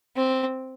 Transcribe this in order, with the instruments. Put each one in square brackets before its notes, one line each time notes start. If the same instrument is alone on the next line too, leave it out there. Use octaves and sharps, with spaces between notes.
[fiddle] C4